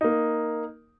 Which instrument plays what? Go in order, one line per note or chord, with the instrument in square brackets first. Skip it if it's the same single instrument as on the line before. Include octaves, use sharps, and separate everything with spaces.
[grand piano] A#3 D#4